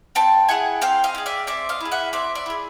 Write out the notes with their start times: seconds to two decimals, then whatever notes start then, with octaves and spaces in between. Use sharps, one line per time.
0.15 C4 G5 A5
0.49 E4 G#4 F#5 G#5
0.81 C4 F5 G5
1.04 D#5 F5
1.15 E4
1.18 G#4
1.26 D5 E5
1.47 C4 D5 E5
1.69 D#5 F5
1.80 E4 G#4
1.92 E5 F#5
2.13 C4 D5 E5
2.35 D5 E5
2.46 E4 G#4